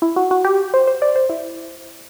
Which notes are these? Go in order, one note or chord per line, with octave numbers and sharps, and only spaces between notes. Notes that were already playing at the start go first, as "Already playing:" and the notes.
E4
F#4
F#4
G4
C5
C5
D5
C5
E4